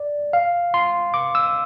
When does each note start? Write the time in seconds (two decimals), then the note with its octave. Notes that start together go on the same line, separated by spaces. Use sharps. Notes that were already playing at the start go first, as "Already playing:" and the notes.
Already playing: D5
0.33 F5
0.74 C6
1.14 D6
1.35 E6